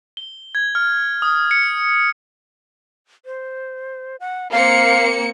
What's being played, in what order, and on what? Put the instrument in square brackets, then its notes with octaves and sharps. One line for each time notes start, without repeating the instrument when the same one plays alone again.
[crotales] G7
G#6
F6
D#6
C#7
[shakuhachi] C5
F#5
[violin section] A#3 C4 C#7 [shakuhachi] F5